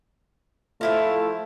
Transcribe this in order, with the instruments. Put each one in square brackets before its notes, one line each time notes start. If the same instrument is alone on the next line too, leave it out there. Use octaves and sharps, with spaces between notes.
[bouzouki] F3 E4 F4 [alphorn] A3